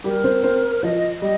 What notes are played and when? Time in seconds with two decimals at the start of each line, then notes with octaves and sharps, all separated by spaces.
0.04 G3 G4 A#4
0.24 C4 C5
0.43 C4 C5
0.83 F3 D#5
1.22 G3 D#5